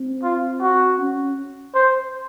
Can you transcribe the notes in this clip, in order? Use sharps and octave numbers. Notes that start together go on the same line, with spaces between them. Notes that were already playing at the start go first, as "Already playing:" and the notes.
Already playing: C4
F4
F#4
C#4
C5